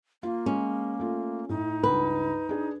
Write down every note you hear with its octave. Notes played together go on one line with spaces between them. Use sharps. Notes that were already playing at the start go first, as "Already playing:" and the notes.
A#3 F4
G#3 C#4
A3 F4
A2 D#4
C#2 G2 B4
D4 G#4